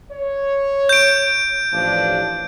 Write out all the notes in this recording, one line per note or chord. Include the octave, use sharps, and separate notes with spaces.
C#5
G6 D7
A1 F3 D4